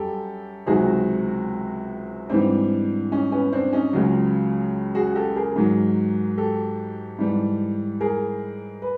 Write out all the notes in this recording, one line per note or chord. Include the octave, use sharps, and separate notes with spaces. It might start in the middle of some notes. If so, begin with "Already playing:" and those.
Already playing: F#2 G3 G4 A4
C#2 C3 D#3 F#3 F#4 G#4
G#2 E3 G3 C4 D4
C#4 D#4
B3 C#4
C4 D4
C#4 D#4
C#2 C#3 F#3
F#4 G#4
G4 A4
G#4 A#4
G#2 D#3 F#3
G4 A4
G#2 E3 G3
G#4 A#4
B4